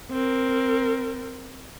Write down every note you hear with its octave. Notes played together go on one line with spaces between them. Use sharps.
C4 A#4